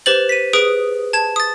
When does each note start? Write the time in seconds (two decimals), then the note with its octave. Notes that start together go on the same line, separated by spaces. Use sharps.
0.06 G4 B4 C5 A6 F#7
0.29 B6 D#7
0.53 G#4 B4 D#6 D7
1.13 A5 G#6 E7
1.36 D#6 A6